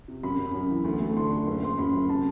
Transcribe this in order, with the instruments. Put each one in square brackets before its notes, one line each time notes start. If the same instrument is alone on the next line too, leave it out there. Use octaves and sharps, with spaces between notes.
[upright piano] C3
F#2 B5
F#2
F#2
E3
D2
A3
D3 C6
D2
F#1
F#1 C6
F#2 B5
F#2
C3 A5